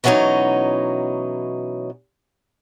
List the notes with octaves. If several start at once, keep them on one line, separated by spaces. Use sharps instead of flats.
B2 E3 F#3 B3 C#4 D#4